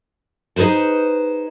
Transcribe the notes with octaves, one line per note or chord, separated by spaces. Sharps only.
D#4 G#4 A4 B4 C5